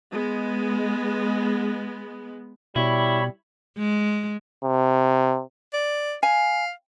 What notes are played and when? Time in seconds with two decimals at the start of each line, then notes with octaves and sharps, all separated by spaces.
0.11 G#3 B3
2.76 B2 G3 E4 C#5 B5
3.78 G#3
4.64 C3
5.73 D5
6.23 F5 G#5